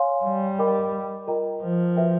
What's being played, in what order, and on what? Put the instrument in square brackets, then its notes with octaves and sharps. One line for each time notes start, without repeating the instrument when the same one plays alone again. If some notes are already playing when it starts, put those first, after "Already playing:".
Already playing: [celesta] C#5 F5 G#5 C6
[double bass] G3
[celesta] A#4 D#5 G5 B5 D6
F4 A#4 D#5 G5 A#5
[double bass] F3
[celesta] F#4 B4 E5 G5